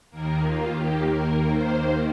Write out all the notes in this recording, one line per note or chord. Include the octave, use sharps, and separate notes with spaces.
D#2 D#3 A#3 A#4
F4
G4
A#4
C5